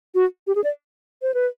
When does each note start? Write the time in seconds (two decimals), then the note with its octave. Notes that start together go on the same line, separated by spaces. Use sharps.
0.15 F#4
0.47 G4
0.56 G#4
0.64 D5
1.22 C5
1.34 B4